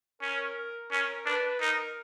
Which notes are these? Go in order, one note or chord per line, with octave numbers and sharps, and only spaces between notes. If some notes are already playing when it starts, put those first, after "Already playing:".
C#4 A#4
C#4 A#4
D4 B4
D#4 A#4